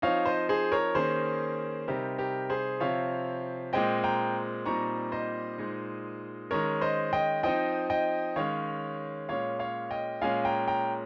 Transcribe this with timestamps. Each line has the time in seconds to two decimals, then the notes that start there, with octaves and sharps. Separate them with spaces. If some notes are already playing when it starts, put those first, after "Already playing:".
0.02 F3 C4 D#4 C#5 F5
0.25 C5 D#5
0.49 G#4 C5
0.72 A#4 C#5
0.95 D#3 A#3 C#4 G#4 C5
1.88 C3 G3 C4 D#4 G4 A#4
2.18 G4 A#4
2.50 G#4 C5
2.80 C3 F3 C4 C#5 F5
3.73 A#2 G#3 C4 D#5 G5
4.04 G5 A#5
4.66 A#2 G3 C4 D#4 A#5 C#6
5.12 C5 D#5
5.58 A#2 G#3 D#4
6.51 D#3 G#3 C#4 A#4 C#5
6.81 C5 D#5
7.13 D#5 G5
7.43 F3 C4 D#4 D#5 G5
7.90 D#5 G5
8.36 D#3 G#3 C#4 C#5 F5
9.29 A#2 G#3 C#4 C#5 F5
9.59 C#5 F5
9.91 D#5 G5
10.21 A#2 G#3 C#4 F5 G#5
10.45 G5 A#5
10.68 G5 A#5